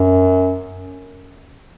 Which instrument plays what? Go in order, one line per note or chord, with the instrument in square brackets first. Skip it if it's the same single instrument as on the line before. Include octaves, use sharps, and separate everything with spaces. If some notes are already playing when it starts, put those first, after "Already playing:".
Already playing: [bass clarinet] F#2